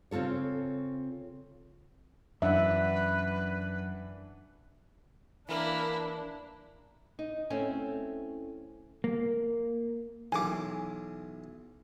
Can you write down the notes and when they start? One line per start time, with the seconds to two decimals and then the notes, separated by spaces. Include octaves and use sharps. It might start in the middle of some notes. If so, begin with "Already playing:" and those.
0.11 C#3 C4 F4 A4 C#5
2.42 F#2 E3 D4 B4 E5 F#5
5.49 E3 A#3 D4 E4 A#4 B5
7.19 D#4
7.50 A3 C4 C#4 E4
9.04 A#3
10.32 B1 E3 G#4 G#5 D6